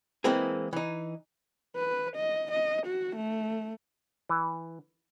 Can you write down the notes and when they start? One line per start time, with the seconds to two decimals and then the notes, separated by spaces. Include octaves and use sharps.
0.24 E3 G#3 A#3 C4 E4 G#4
0.73 E3 D#4
1.76 B4
2.16 D#5
2.51 D#5
2.86 F#4
3.16 A3
4.29 E3